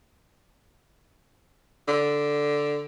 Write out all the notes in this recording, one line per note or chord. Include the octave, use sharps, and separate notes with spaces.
D3